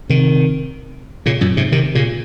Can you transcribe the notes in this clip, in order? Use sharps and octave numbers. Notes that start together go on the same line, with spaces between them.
C3 D#3
A#2 C#3
F#2 A#2
G#2 C3
C3 D#3
A#2 C#3